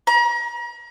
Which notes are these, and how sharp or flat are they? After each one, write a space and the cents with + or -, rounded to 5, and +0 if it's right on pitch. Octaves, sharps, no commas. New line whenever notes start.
A#5 +40